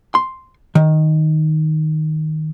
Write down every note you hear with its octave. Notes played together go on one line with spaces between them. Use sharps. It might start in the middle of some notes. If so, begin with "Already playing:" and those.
C6
D#3